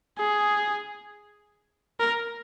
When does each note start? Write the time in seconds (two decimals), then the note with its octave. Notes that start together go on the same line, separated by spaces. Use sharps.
0.18 G#4
2.00 A#4